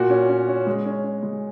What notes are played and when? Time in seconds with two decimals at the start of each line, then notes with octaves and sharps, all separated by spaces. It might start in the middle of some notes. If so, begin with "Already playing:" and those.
Already playing: A#2 F#4
0.10 C#4
0.29 C#4
0.48 C#4
0.66 G#3
0.86 C#4
1.04 C#4
1.23 G#3